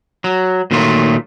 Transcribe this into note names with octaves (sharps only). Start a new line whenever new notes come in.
F#3
A#2 D#3 F#3 A3 F4